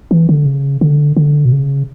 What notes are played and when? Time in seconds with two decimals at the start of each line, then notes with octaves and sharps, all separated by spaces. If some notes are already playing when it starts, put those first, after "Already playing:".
0.11 E3
0.29 D3
0.46 C#3
0.81 D3
1.17 D3
1.45 B2
1.52 C#3